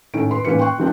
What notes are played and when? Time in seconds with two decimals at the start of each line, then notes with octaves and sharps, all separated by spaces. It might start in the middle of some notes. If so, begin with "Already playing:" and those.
0.14 A2 D#3 C#4 D7
0.31 B4 B5 C6
0.45 A1 D#3 A#3 C#4 B4 C#7
0.59 G5 C6 C#6 F#6
0.78 D#3 F3 C4 D4